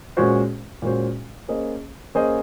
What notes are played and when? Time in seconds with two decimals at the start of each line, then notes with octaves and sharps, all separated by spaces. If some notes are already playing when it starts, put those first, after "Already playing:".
0.17 A#2 G#3 C#4 F#4 C5
0.82 A#2 G#3 C#4 F#4 C5
1.48 A#3 C#4 G#4 C5 D#5
2.15 A#3 C#4 G#4 C5 D#5